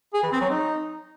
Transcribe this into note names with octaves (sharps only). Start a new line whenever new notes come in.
G#4
E3
C4
F#3
D#4